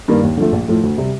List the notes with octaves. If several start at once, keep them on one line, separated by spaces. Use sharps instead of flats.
G2 D#3 A#3 D4
D#2
D3 F3 A3
A#1
A2 F3 A3
D2
C3 G3